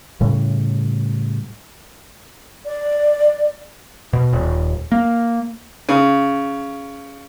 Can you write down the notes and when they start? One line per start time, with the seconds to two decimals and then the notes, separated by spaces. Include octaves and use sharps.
0.21 A2 C#3 G3
2.65 D5
4.13 B2
4.33 D#1
4.92 A#3
5.89 C#3